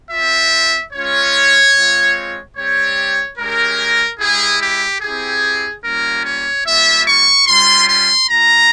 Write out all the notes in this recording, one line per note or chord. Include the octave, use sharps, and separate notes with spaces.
C4 F4 E5
G#3 C#4 F4 C#5
G#3 C4 F4
G3 C4 G4 C#5
G#3 C#4 G4 A#4
G#3 E4 G4 G#4
G4
C4 E4 G4 G#4
G3 A#3 C#4 F4 A#4
C#5
G3 A#3 F4 E5
C#6
G3 C#4 F4 C6
C6
A#3 F4 A#5